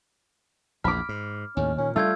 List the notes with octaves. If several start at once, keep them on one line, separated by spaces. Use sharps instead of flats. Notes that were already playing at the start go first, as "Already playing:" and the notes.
A#1 E2 B5 D6 F6
G#2
D#2 A2 C#4
A#2 D#3 C#4
G3 A3 F4 E6 G6 G#6